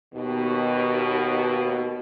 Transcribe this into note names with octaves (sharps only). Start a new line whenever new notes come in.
D#2 B2